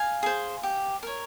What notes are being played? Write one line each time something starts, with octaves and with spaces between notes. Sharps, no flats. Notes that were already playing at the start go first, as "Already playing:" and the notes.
Already playing: F5 G#5
G#4 C5
G4
A#4 C#5